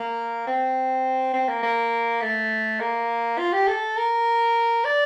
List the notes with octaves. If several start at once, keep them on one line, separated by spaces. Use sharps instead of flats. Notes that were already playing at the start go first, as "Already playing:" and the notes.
Already playing: A#3
C4
C4
A#3
A#3
A3
A#3
F4
G4
A4
A#4
D5